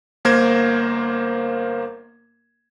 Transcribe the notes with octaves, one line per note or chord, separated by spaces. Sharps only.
G1 A#3 A#4 C5 G#6